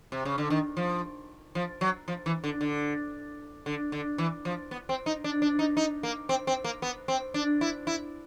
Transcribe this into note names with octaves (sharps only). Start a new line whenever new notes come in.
C3
C#3
D3
D#3
F3
F3
F#3
F3
E3
D3
D3
D3
D3
E3
F3
B3
C4
D#4
D4
D4
D#4
D#4
A#3
C4
C4
A#3
B3
C4
D4
E4
E4